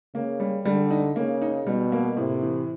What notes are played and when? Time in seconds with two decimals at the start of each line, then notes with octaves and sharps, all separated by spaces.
0.15 C#3 A#3
0.40 G3
0.65 D3 G3
0.90 D#4
1.16 C#3 A#3
1.41 D#4
1.67 B2 G3
1.92 A#3
2.17 A2 C3
2.42 E3